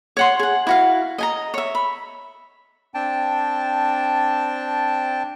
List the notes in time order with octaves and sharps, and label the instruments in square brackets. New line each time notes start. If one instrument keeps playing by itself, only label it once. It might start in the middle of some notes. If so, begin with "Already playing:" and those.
[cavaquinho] C#5 F#5 C6
G#4 F#5
E4 F#4 F5
D#5 G#5 A#5
C#5 E5
B5
[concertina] C4 D4 G5 A5